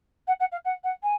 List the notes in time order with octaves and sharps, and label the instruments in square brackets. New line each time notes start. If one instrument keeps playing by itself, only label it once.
[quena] F#5
F#5
F5
F#5
F#5
G#5